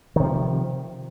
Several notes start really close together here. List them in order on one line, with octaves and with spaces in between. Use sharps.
D#3 C3 F3